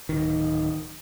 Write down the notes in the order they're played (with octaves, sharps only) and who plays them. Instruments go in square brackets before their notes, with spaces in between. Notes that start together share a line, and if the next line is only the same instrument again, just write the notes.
[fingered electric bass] D1 D#3